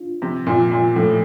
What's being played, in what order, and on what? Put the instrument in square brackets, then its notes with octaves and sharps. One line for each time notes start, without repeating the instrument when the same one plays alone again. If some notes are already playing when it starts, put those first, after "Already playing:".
Already playing: [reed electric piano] D4 F4
[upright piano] C3 [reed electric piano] F3
[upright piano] A#2
[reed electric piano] F3
[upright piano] A#2
[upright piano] A2 [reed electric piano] F3